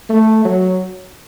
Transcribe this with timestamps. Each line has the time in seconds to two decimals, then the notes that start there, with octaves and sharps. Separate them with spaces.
0.10 A3
0.45 F#3